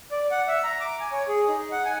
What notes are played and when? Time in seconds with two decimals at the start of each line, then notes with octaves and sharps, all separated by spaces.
0.11 D5
0.31 F#5
0.48 E5
0.64 A#5
0.80 D6
1.00 G#5
1.12 C#5
1.28 G#4
1.48 D#4
1.72 F#5
1.85 G#5